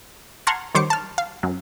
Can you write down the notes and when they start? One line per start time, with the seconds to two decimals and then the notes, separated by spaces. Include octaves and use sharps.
0.47 F#5 A5 A#5 C6 F6 G#6
0.75 D#3 G3 C5 C#5 D6 C#7
0.90 A5 F6
1.18 F5
1.43 F#2